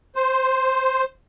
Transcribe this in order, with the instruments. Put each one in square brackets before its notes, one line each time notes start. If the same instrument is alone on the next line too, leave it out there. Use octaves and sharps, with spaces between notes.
[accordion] C5